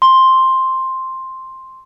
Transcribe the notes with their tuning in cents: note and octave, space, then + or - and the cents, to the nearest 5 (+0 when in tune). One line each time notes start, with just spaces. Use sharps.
C6 +5